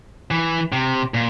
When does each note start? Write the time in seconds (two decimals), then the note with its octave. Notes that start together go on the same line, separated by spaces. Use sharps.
0.31 E3
0.72 C3
1.14 A#2